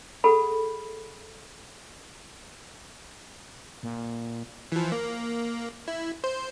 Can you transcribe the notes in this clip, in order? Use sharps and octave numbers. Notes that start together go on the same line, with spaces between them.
G#4 A4 F#5 B5
A#2
E3 F3
A#3
E4
C5